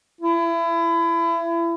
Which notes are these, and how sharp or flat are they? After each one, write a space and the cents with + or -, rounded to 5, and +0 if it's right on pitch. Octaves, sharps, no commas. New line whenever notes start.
E4 +30